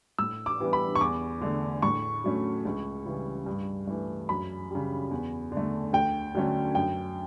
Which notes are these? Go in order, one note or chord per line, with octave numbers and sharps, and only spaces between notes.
A2 E6
D6
E3 G3 B3
B5
C#6
E2 D6
D3 A3
A2 C#6
F#3 A3 C#4
C#2
C#3 E3 G3
G2
E3 A3
F#2 B5
C#3 G3
E2
D3
A3
D2 G5
D3 F#3 A3 C#4
F#2 G5